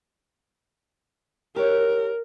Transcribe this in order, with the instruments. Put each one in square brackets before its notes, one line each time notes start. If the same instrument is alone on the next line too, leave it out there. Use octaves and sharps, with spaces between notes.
[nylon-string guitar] G4 C#5 [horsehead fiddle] A#4